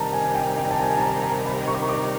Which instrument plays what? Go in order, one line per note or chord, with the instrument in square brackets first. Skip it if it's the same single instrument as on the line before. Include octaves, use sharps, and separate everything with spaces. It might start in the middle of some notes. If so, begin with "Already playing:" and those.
Already playing: [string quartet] C3 D#3 G3 A#3 D#4 [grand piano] A5 A#5
[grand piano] G#5
G5
G5
A5
G#5
A5
A#5
A#5
B5
C#6
D6
C#6
D6